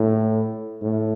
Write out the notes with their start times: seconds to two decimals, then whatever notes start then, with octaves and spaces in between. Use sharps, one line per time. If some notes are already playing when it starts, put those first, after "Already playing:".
Already playing: A2
0.82 A2